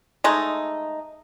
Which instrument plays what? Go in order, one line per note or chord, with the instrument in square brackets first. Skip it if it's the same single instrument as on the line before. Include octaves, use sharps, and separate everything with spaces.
[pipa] G#3 A3 D#4